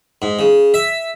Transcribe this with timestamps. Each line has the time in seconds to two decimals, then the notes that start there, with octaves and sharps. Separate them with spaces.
0.22 G#2
0.39 C#3
0.74 E5